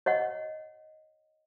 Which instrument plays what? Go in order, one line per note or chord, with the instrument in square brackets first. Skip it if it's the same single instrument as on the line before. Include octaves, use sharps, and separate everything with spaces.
[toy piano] C#5 D#5 F#5